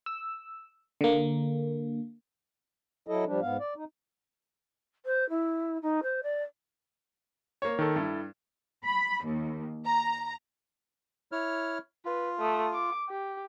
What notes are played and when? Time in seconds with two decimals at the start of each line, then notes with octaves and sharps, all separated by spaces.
0.06 E6
1.01 D3 A#3
3.07 F#3 E4 A4 D#5
3.26 F3 G3 D4
3.41 G#2 B3 F5
3.60 D5
3.77 D#4
5.06 C5
5.30 E4
5.82 D#4
6.03 C5
6.23 D5
7.62 A#3 C#5
7.79 D#3 A4
7.96 G2 E4 A4
8.84 B5
9.24 D#2
9.85 A#5
11.32 E4 C#5 F6
12.05 F4 B4
12.39 A3 D#6
12.74 D6
13.10 G4